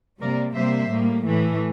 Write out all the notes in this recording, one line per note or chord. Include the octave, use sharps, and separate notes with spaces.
C3 G3 A#3 A#4 D5
C3 G3 A#3 C5 E5
A2 G3 A#3
A2 E3 A3